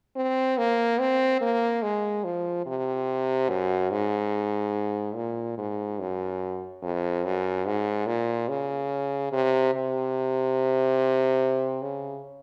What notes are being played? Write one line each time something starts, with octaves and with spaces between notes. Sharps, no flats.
C4
A#3
C4
A#3
G#3
F3
C3
F#2
G#2
A#2
G#2
F#2
F2
F#2
G#2
A#2
C#3
C3
C3
C#3